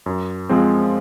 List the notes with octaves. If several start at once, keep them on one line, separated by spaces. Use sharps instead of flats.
F#2
F3 G#3 C4